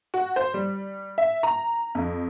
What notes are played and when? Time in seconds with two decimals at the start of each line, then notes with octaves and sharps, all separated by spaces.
0.14 F#4
0.36 C5
0.54 G3
1.18 E5
1.43 A#5
1.95 F2